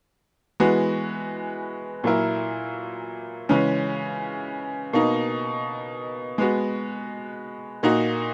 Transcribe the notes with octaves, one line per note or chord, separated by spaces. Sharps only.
E3 G#3 B3 F#4
A#2 F#3 A#3 E4 A#4
C#3 E3 G#3 C#4
B2 A#3 D#4
G#3 B3 F#4
A#2 A#3 D#4 F#4